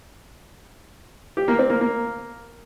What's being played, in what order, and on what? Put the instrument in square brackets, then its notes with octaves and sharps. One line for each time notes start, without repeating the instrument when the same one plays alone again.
[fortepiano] G4
A#3
C4
A#3
A#3